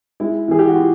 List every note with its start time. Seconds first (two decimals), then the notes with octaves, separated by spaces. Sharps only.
0.20 G#3 E4
0.48 E3 G#4
0.59 G4
0.67 F#4
0.76 F4